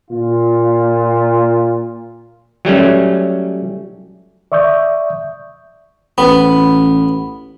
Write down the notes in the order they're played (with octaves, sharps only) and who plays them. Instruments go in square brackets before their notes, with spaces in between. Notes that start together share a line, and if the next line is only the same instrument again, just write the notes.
[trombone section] A#2 F4
[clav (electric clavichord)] F#3 G3 A3 C#4
[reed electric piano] D5 E5 C#6 D#6 G6
[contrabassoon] A1 [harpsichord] B3 [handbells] B5